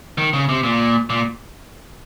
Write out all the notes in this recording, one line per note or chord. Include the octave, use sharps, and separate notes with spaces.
D#3
C#3
C3
A#2
A#2